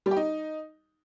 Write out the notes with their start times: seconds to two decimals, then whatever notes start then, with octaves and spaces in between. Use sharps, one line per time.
0.06 G3
0.11 G4
0.16 D#4